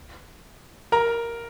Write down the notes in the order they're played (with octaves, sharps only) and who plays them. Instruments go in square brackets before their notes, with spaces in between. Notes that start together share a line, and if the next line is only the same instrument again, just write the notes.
[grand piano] A#4 A#5